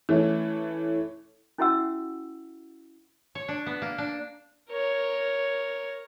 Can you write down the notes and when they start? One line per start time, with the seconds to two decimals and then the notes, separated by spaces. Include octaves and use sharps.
0.09 E3 A3 C#4
1.58 C#4 E4 F#4 E5 F#5 E6
3.35 C#5
3.48 D4
3.66 B3
3.82 A#3
3.98 D4
4.70 A#4 C#5